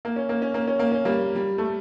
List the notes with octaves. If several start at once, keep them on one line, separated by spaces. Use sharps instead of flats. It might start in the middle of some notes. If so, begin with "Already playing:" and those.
A#3
C#4
A#3
C#4
A#3
C#4
A#3
C#4
G3 A#3
G3
A3